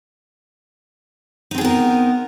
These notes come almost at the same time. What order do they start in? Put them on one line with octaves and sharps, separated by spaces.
D#4 C4 G#4 B3 A#4